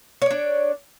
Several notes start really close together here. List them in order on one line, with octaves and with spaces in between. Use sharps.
C#5 D5 D4